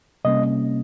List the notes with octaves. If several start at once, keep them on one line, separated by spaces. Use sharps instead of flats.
C3 G3 A#3 C#4 D#5